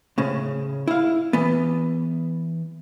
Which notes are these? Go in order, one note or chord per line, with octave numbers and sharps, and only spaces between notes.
A2 C#3
E4 F5
E3 B3